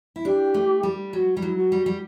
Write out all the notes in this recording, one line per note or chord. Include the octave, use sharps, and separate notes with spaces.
E4
D4 G4
A3
G3
F#3 F#4
G3
F#3 E4
F#4
G3
G3